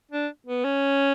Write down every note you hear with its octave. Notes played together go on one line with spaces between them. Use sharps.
D4
B3
C#4